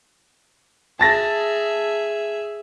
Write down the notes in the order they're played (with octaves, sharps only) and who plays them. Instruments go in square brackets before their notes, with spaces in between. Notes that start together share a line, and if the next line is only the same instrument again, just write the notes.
[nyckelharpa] G#4 E5 [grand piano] A5 A6 A#6